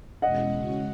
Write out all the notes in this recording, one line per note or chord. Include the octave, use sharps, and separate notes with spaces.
E2 B2 G#3 C#4 E4 D#5 F#5
C#3 G#3 C#4 F#4